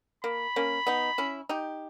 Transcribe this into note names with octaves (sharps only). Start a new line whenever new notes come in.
A#3 B5
A#3 C#4
B3 D#4
C#4 E4
D#4 G4